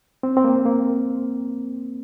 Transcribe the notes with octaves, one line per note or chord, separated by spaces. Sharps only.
C4
C4
A#3
A#3